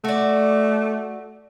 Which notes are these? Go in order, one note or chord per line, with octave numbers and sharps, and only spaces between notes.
A3 F#4 D5